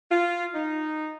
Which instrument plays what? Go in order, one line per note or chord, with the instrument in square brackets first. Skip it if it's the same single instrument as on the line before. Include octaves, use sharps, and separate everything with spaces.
[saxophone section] F4
D#4